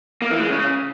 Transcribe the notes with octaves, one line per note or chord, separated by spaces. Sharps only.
A#3
E3
G#3
C#3